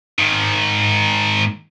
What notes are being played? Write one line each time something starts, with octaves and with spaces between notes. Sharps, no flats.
G#2 D#3